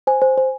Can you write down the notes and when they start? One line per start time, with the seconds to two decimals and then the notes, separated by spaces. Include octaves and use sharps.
0.07 C5 G#5
0.22 C5
0.38 C5